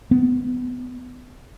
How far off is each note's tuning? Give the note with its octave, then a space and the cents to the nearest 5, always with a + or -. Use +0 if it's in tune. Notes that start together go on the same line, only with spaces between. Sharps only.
B3 +20